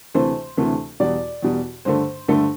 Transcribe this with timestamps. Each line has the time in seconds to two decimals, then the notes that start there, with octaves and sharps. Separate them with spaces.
0.15 D2 C3 E3 A3 C5
0.57 D2 C3 E3 A3
1.00 E2 B2 G3 D5
1.43 E2 B2 G3
1.85 G2 D3 A3 C5
2.28 G2 D3 A3